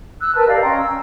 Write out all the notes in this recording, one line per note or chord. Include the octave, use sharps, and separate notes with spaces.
E6 F#6
A#4 B4 A5
G4 D5 D#5 F5
C#4 G5 A#5 C6
E6